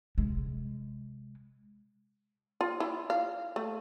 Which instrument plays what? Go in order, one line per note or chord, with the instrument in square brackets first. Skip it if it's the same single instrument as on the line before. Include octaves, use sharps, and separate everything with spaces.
[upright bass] C3 G#3
[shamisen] F4
E4
F5
A3